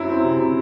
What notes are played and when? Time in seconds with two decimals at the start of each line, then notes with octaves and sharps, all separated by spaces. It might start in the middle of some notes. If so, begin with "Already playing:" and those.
Already playing: F#2 F#3 E4
0.09 C4
0.23 C3
0.39 C3